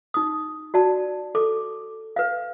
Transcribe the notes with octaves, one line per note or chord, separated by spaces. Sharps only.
D#4 D#6
F#4 D5 A5
A4 D6
B4 F5